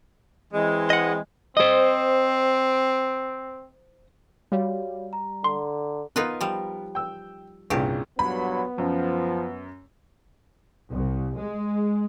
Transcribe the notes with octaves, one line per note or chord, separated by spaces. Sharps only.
E3 G#3 C4
D#5 F#5
C4 C5 D#5
G3 F#4 C#5 F5
A#5
D3 C6
B3 D#4 F4 A#4 B4
F3 G3
G5 E6
C2 G2 A#2 C#3 G4
G2 A#2 F#3 B3 B5
F#2 F3
C2
G#3